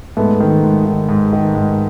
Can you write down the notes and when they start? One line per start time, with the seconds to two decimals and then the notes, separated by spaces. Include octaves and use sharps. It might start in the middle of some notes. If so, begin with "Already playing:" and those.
0.17 G#2 A3 B3
0.40 D#3
0.64 G#2
0.86 D#3
1.09 G#2
1.33 D#3
1.55 G#2